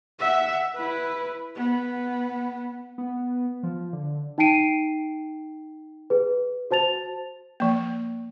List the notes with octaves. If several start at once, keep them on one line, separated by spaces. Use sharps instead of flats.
E5 F#5
E4 B4
B3
B3
F3
D3
D#4 G5 A5 C7 D7 D#7
G#4 B4
F#4 C5 A5 A6 F7
F3 A#3